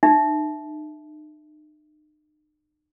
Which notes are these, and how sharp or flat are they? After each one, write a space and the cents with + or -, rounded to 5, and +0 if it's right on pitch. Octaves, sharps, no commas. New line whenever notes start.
D#4 -40 E5 +0